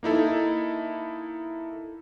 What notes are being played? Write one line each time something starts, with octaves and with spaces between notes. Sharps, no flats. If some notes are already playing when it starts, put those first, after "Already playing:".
A#3 D#4 E4 A4